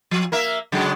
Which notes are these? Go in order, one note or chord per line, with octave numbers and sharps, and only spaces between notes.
F3
A#3 A#4 E5
C#3 F#3 G#3